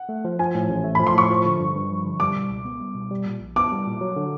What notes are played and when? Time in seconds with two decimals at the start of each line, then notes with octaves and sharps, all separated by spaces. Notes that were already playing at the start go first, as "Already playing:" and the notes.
Already playing: F#5
0.09 A3
0.25 F3
0.39 F3 G#5
0.54 A2
0.69 A1
0.84 A3
0.95 B5
1.00 F3
1.07 C6
1.15 A2 C#6
1.30 F3
1.45 D3
1.59 G2
1.75 G2
1.90 F3
2.05 D3
2.20 G3 D6
2.36 B2
2.50 C#2
2.65 B3
2.81 G3
2.95 B2
3.11 G3
3.26 A#2
3.40 A#1
3.56 B3 D6
3.72 G3
3.87 A#2
4.01 F#3
4.16 D3